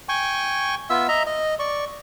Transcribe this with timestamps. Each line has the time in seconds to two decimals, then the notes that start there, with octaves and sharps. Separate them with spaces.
0.09 G5 G#5 C#6
0.90 B3 F4 E5 E6
1.08 D#5 E5 A#5
1.26 D#5
1.59 D5 C#6